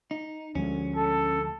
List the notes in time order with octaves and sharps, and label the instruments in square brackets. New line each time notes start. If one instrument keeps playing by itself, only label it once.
[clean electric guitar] D#4
[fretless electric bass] D2 F3 G#3 [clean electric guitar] C#4
[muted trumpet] A4